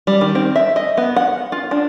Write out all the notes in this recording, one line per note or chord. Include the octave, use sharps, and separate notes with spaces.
G3
D#3
C4
E5
D#5
B3
F#5
F4
D4